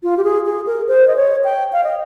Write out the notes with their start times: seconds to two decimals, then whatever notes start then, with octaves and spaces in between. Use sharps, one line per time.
0.03 F4
0.17 G4
0.24 G#4
0.45 G#4
0.67 A#4
0.88 C5
1.08 D#5
1.16 C#5
1.44 G5
1.73 F5
1.84 D#5